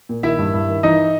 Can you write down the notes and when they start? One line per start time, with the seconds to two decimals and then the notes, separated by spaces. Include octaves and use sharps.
0.09 A#2
0.23 D#3 E4 E5
0.39 G2
0.54 G2
0.69 D#3
0.83 E3 D#4 D#5